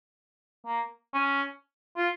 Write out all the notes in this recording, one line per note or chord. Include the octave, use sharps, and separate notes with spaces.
A#3
C#4
F4